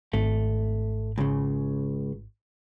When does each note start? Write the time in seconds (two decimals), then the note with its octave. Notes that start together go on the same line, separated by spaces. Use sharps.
0.13 G#1 A3
1.18 C#2 C#3